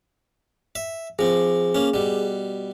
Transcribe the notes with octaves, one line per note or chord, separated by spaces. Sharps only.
E5
F3 C4 G#4
A#3 C#4
B2 G3